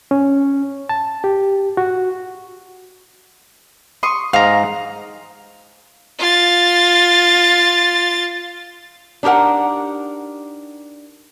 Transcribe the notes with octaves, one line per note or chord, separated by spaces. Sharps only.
C#4
A5
G4
F#4
C6 C#6 D#6
G#2 F5 A#5
F4 A6
D4 D#4 G4 A#4 F#5